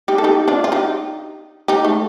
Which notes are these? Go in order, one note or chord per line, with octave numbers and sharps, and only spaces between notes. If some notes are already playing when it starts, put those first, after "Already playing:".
D#4 G4
A4
D#4 G4
D4 F4
F4
D#4 G4
D#4 G4
A3